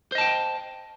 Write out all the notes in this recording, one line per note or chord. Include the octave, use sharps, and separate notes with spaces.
C5 D#5 G5 A5